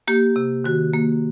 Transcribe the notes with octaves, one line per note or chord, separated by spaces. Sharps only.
A#3 G4
C3
D#3 F#4
A#3